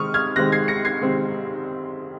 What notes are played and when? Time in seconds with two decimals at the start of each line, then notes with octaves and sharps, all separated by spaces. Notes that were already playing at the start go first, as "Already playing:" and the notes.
Already playing: C3 D#3 G#3 C4 C#6 D#6 F6
0.14 F6 G#6
0.36 C3 D#3 G#3 C4 F#6 A#6
0.52 G#6 C7
0.68 A#6 C#7
0.85 G#6 C7
1.01 C3 D#3 G#3 C4